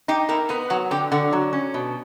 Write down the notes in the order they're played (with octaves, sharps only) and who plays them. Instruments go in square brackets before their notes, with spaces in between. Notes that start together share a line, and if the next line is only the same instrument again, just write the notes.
[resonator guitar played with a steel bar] D#4 [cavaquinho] G4
[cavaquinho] E4 [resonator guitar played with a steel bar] A#4
[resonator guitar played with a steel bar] B3 [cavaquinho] D#4
[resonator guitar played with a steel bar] F#3 [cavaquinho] F#4
[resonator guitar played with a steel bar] D3 [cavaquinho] G4
[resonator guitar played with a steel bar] D3 [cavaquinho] F#4
[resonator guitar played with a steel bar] F#3
C#4
B2